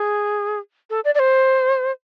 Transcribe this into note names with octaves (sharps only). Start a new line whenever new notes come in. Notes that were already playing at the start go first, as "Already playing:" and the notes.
Already playing: G#4
A4
D5
D5
C5